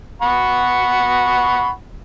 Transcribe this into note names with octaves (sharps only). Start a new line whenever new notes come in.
F#5 B5 C#6